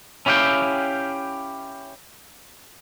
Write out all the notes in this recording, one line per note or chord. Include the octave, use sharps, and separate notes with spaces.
C#4 E4 G4 F5 G5